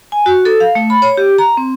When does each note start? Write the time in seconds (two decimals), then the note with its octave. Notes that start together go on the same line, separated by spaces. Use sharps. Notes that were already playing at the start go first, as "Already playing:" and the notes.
0.12 G#5
0.26 F#4
0.45 A4
0.60 F5
0.75 A3
0.90 B5
1.02 C#5
1.17 G4
1.38 A#5
1.57 C4